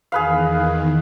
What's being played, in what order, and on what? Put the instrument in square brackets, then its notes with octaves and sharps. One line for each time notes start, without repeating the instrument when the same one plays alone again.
[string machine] E2 D#3 [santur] G#4 B4 F5